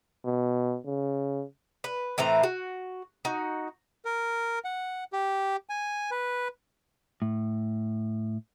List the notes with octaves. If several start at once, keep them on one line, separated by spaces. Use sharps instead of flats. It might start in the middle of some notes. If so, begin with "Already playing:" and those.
B2
C#3
B4
A2 E3 C4 A#5
F#4
D#4 F#4
A#4
F#5
G4
G#5
B4
A2